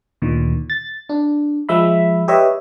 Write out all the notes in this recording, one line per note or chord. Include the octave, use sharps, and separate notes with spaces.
D2 A#2 D#3
A6
D4
F3 G#3 E5 B5
G4 B4 C#5 D#5 E5